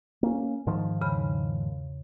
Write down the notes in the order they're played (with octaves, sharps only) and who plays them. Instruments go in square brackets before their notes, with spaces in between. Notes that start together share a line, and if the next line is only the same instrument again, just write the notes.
[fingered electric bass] A#3 C#4
G#2 D#3 F3
[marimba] E2 C#3 B5